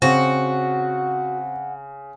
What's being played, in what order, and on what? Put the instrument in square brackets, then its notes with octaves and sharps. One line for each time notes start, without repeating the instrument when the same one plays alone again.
[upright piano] C#3 [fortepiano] C4 [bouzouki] F#4 [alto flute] F#5